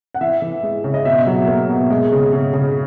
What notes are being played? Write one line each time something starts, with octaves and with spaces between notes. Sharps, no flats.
F#5
E3 E5
E3
G#3
C#3
D#5
B2 E5
F#3
A#3
B2
G#3
C#3
C#3
C#3